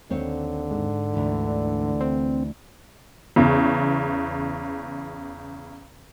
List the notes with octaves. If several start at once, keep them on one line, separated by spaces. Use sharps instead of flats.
D#2 D3 C4 C#5
G#2
D2 E3
C4
E2 C#3